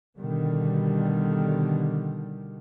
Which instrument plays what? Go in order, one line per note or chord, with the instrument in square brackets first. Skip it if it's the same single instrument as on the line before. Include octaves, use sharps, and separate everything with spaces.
[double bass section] B2 D3 D#3 G3